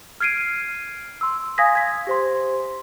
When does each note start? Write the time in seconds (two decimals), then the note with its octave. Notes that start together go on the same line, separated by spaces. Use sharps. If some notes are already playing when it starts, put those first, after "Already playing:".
0.20 F6 G#6 C7 D7 D#7
1.21 C6 E6
1.58 F5 G#5 D#6 G#6 A#6 B6
1.75 G#6 B6
2.07 G4 C5 C6